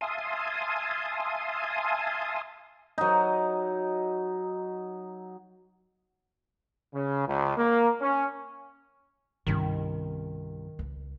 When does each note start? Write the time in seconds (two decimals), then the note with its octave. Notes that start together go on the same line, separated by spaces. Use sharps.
0.01 E5 F5 G#5 A5 C6 D#6
2.98 F#3 D#4
6.95 C#3
7.27 C#2
7.57 A#3
8.02 C#4
9.47 C2 G2 D#3 C#4
10.79 C#2